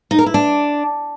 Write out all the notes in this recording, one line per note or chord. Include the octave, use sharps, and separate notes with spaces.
D#4
A#4
E4
D4